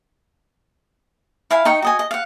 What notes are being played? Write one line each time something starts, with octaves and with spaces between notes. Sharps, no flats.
E4 F5 G#5
D#4 D#5 G5 C#6
F#4 D#5 G#5
D#5
F5 F#5